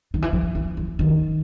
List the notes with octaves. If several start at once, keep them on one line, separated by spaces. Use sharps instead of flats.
D#3
E3
F3
E3
E3
D#3